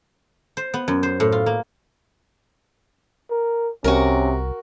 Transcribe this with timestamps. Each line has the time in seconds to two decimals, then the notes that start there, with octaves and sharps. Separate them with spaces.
0.57 C5
0.74 B3
0.88 F#2
1.03 C5
1.20 A2
1.32 F4
1.46 A#3
3.31 A#4
3.84 C2 C3 C#4 F#4 A#4